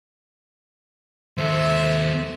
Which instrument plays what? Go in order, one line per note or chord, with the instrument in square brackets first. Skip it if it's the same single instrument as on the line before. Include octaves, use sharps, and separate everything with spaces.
[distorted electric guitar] D#2 A4 [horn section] C5 E5